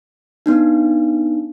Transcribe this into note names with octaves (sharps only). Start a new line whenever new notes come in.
B3 D4 D#4